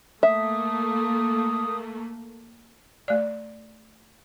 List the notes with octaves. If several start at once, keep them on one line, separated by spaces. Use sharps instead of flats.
A3 A#3 E5 D#6
A3 D5